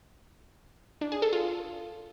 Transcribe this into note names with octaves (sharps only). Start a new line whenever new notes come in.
D4
G#4
A4
F4